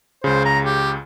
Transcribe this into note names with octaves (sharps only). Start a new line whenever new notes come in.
C#2 C#3 C5
A#5
G4